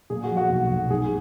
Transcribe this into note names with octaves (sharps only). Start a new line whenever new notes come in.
A#2 G#4
F#4
F3
F#4
B1
B1
G#2 G#4